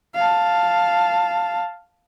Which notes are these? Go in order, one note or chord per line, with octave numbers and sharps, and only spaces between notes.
F5 A5